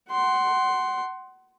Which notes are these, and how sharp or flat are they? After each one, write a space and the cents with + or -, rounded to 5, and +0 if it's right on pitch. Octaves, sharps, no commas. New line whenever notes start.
F#5 +20 C6 +0